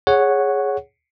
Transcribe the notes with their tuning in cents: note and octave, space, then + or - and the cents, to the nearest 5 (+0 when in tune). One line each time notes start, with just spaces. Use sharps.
G#4 +0 C#5 +0 F#5 +0